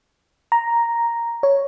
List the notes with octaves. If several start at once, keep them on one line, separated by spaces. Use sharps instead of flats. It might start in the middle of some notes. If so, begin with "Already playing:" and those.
A#5
C#5